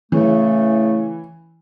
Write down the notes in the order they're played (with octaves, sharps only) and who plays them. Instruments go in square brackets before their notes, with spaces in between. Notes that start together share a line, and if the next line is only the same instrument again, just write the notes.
[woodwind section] C#3 A3 [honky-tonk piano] E3